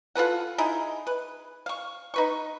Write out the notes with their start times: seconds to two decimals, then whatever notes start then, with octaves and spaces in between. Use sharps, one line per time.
0.15 F4 A4 B4 F#5
0.58 D#4 E4 G#4
1.07 B4
1.66 F5 C#6
2.14 D#4 B4 C#6